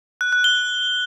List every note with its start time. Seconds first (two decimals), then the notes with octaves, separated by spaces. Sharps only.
0.21 F#6
0.33 F#6
0.44 G7